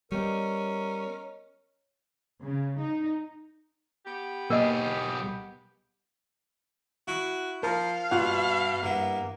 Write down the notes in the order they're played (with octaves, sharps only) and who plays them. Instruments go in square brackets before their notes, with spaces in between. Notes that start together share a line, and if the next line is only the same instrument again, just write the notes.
[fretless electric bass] G3 B3 [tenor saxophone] C#4 [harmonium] A#4 [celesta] C#5 D#5
[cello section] C#3
D#4
[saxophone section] B3 G4
[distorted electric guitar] B1 G#4 [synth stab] A#3 [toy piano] A#4 D#5
[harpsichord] E4 [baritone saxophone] F#4
[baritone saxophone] F3 [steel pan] A#4 [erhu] F5
[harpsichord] G2 [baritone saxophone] B2 [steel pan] F4 F#5
[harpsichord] G2 E3 B3 [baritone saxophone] A#3